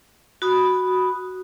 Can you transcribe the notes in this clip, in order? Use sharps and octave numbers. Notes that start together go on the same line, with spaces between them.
F#4 B5 D#6